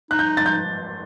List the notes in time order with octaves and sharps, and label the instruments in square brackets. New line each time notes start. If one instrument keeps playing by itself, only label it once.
[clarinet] D#4 [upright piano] F#6
[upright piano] G6
A6
G6